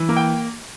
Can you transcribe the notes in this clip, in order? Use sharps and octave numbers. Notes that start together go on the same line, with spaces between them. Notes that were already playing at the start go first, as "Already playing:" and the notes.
Already playing: E3
A#3
G5